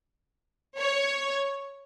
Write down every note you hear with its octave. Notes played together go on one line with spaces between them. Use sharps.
C#5